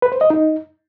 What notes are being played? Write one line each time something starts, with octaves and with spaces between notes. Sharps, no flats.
B4
C5
D#5
D#4